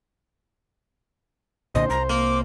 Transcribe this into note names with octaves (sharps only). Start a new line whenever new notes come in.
B1 A#2 D3 C5 D#5
C2 A#5
A#3 D6